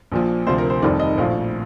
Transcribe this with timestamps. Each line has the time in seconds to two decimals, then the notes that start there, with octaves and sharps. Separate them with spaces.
0.12 A#1 A#2 F3
0.47 D2 C3 F3 C5
0.58 A#4
0.70 C5
0.82 F1 F2 D#3 G3 D5
1.00 D#5
1.18 A#1 A2 F3 F5